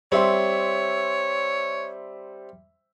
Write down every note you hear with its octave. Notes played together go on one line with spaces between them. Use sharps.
G3 C4 C#5 E5 C6